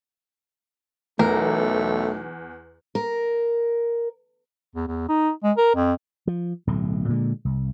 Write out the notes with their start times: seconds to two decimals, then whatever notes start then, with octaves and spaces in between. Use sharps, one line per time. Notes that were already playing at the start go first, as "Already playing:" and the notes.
1.19 B1 E2 A3 A#4
2.95 A#4
4.75 E2
4.87 E2
5.09 D#4
5.43 G#3
5.57 A#4
5.75 F2
6.27 F3
6.67 D1 B1 A2
7.08 A#2 D3 G#3
7.45 C2